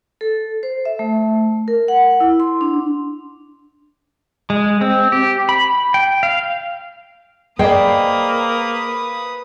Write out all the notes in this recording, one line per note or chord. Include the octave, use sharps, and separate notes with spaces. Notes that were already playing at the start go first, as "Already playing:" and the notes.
A4
C5
E5
A3
A#4
F#5
E4
C6
D4
G#3
C4
G4
B5
G5
F5
A#3 G#4 B4 C5 D5 D#5 G5 D#6